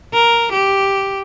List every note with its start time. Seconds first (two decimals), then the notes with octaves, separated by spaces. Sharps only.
0.14 A#4
0.53 G4